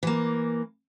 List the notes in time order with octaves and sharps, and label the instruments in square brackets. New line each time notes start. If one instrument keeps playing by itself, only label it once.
[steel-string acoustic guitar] E3 A#3